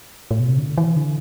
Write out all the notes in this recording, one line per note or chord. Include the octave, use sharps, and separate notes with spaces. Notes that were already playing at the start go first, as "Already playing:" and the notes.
A2
B2
C3
D3
E3
D3